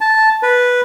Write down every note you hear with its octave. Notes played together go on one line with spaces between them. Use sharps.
A5
B4